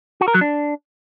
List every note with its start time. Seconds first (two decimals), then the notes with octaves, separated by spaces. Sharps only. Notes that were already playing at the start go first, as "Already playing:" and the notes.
0.21 F#4
0.28 A#4
0.34 F#3
0.41 D4